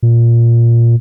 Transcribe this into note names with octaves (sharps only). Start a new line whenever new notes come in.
A#2